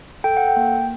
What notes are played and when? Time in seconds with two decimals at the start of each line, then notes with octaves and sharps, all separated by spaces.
0.24 A4 G5
0.37 F#5
0.48 G5
0.57 A#3